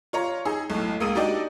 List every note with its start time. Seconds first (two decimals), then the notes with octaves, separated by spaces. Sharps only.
0.13 F4 C#5 A#5
0.45 D#4 G#4 E6
0.70 B1 A2
1.00 C#2 A#3 D#6 E6 D#7
1.15 D4 D#4 F#4 G4 D5 D#5